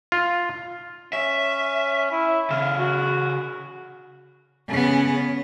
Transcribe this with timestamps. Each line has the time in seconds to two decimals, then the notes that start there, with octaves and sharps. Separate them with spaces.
0.12 F4
1.13 C#4 E5
2.11 E4
2.50 C#3 A4 F5
2.78 F#4
4.69 C#3 B3